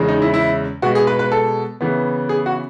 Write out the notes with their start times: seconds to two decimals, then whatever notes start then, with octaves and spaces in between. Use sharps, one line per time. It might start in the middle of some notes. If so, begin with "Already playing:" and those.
Already playing: E2 C#3 G#3
0.08 D#4
0.22 E4
0.34 E4
0.82 B2 G#3 B3 F#4
0.95 G#4
1.07 B4
1.19 B4
1.32 A4
1.81 C#3 E3 B3
2.29 G#4
2.46 F#4